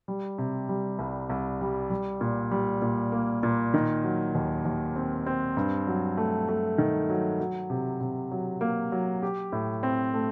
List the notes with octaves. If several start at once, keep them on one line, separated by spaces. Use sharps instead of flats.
G3
C3
G3
C2
C2
G3
G3
A#2
G3
A#2
A#3
A#2
D#3
F#3
D#2
D#2
C4
C4
G2
F#3
A3
A3
D#3
F#3
F#3
C3
C3
F#3
A#3
F#3
G4
A2
C4
A3